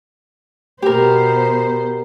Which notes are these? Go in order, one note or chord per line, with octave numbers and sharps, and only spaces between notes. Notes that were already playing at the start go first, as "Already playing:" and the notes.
B2 G4 A#4 C5